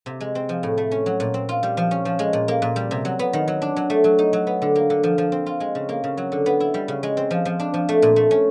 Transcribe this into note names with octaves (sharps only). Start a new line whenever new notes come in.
C3
G#3
C4
F3
A2
A3
C#4
F#3
A#2
C4
F4
G3
F3
C#4
F3
G#3
A#2
A#3
A#2
G3
C3
F#3
B3
D#3
F#3
D4
F#3
A3
F#3
D#4
F#3
B3
D3
A#3
D3
F3
F3
C4
F4
G#3
C#3
A#3
C#3
F#3
D3
B3
E4
G3
C#3
G#3
C4
F3
F3
D4
F3
A3
A#2
A3
C#4